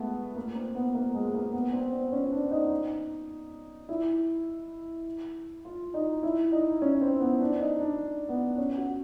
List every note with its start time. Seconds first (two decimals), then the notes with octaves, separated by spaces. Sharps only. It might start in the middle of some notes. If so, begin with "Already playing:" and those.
Already playing: G#3 A3 B3
0.36 A#3
0.55 C4
0.75 B3
0.95 A#3
1.14 G#3
1.34 A#3
1.53 B3
1.73 C4
1.93 C4
2.12 C#4
2.32 D4
2.51 D#4
3.89 E4
5.65 F4
5.94 D#4
6.23 E4
6.52 D#4
6.82 C#4
7.01 C4
7.20 B3
7.40 D4
7.60 D#4
7.80 D4
8.29 B3
8.58 C#4
8.77 F#4